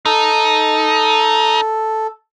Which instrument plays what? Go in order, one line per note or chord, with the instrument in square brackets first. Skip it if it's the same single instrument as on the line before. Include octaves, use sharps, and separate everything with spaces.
[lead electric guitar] D#4 [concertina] A4